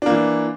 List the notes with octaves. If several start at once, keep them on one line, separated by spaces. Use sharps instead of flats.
E3 A#3 D4